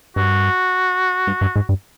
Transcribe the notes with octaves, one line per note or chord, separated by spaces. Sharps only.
G2 F#4
G2
G2
G#2
G2